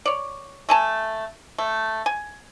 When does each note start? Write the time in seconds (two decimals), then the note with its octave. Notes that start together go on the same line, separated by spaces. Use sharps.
0.06 C#5 D5
0.69 A3 G#5 A5
1.58 A3
2.06 G#5